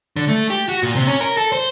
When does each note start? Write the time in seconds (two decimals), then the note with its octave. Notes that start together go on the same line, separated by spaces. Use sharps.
0.16 D3
0.28 A3
0.50 G4
0.69 F#4
0.83 A#2
0.95 C3
1.07 C#4
1.21 A#4
1.37 A4
1.52 C5